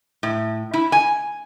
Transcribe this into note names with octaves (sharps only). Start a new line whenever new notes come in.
A2
E4
G#5